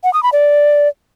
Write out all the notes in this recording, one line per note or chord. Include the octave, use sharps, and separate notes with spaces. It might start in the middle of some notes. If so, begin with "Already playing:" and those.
F#5
D#6
B5
D5